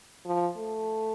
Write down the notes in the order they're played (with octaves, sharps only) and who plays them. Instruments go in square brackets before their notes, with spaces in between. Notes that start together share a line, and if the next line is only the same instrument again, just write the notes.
[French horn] F3
A3